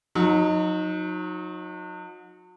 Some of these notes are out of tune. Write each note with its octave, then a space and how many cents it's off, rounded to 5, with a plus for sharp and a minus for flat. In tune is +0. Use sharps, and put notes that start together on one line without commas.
F#3 -35 D#4 +0